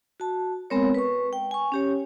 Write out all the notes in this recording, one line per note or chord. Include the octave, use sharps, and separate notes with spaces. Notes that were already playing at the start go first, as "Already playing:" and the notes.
F#4 A5
G#3 B3 C4 A#4 C#5
B4 C#6
G5
G#5 C#6
C#4 G4 C#5